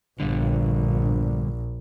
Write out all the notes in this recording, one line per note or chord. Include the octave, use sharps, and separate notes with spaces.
A#1 G2 D3